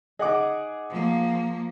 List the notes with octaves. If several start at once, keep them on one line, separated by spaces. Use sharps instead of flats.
D#4 G#4 D#5 F#5 D6
F3 A#3